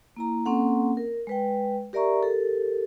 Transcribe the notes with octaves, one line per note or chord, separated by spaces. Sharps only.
A#3 E4 A#5
A#3 C4 C#4 A4 F#5
A#4
G#3 B4 G5
G4 A#4 D5 E5 A#5 C#6
G4 A4 A#4